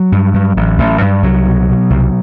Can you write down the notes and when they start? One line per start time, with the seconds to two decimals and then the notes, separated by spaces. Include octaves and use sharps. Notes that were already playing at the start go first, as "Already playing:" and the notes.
Already playing: F#3
0.12 G2
0.34 G2
0.57 A1
0.78 A1
1.02 G2
1.23 C2 F#3
1.46 B2
1.68 B2
1.90 C2